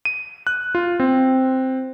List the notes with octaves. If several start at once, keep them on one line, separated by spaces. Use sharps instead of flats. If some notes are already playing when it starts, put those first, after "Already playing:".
D#7
F#6
F4
C4